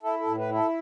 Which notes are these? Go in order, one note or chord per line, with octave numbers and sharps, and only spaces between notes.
E4 A4
A4
A2
B4
E4
A4